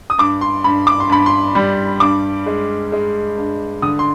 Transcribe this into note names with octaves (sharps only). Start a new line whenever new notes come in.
D#6
G2 D6
C6
G2 B5
D6
C6
G2 B5
C6
G3
G2 D6
G#3
G#3
G2
D3 D#6
C6